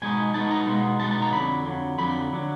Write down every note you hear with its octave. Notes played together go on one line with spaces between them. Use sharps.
B2 G#3 B3 D#4 G#5
B2 G#3 B3 D#4 A5
A#5
B2 G#3 B3 D#4
B2 G#3 B3 D#4 A5
A5
A#5
F2 D3 F#3 B5
F2 D3 F#3
F2 D3 F#3 B5
D3 F#3